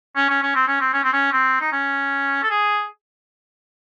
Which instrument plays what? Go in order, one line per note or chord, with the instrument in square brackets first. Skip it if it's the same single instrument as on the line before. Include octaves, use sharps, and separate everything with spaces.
[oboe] C#4
C#4
C#4
C4
C#4
C4
C#4
C4
C#4
C4
D#4
C#4
A4
G#4